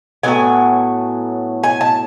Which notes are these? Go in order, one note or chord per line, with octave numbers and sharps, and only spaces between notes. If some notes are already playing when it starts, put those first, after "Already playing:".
A2 F#3 B3 G#5
G#5
A5